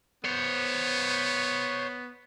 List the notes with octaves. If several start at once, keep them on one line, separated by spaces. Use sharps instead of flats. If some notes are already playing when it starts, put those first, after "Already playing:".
B3 C5 C#5